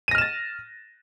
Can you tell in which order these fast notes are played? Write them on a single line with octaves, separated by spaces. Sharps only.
D#7 A#6 F6 E7 A6